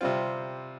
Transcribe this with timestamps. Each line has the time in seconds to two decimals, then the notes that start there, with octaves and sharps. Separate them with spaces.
0.01 C3 G3 C4 F4